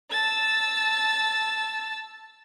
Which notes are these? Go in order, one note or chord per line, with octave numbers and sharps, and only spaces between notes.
A5 E6 A6